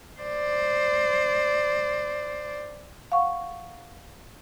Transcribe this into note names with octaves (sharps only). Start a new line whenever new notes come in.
C5 D5
F5 F#5 C#6